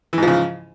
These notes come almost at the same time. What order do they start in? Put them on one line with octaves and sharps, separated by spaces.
E3 G#2 F3 C#3